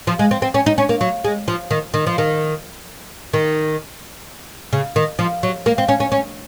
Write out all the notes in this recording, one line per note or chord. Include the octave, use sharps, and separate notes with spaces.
F3
G#3
C4
C4
C#4
D#4
C#4
A#3
F#3
G#3
F3
D#3
D#3
F3
D#3
D#3
C#3
D#3
F3
F#3
A#3
C4
C#4
C#4
C#4